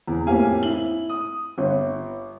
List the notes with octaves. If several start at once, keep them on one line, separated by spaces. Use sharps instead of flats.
E2
F2 A2 A#3 G4 F5 G#5
E4 F#7
D#6
G1